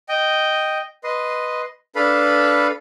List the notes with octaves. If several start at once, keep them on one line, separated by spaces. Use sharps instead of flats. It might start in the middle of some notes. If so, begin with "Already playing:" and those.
D#5 G5
B4 D#5 C6
D4 A4 B4 F5 B5